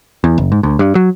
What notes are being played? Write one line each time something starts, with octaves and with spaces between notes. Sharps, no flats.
E2
F#1
G#2
D2
G2
F#3